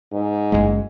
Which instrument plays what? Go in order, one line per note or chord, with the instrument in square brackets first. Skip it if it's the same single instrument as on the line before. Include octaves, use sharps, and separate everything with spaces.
[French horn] G#2
[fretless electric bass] F#1 E2 G#3